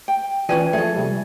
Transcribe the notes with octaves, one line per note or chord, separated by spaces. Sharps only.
G5
E3 C#4 F4 B4 D5 G5 G#5
F3 A3 G#4 A4 E5
C3 G3